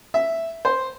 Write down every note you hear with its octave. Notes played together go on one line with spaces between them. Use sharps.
E5
C5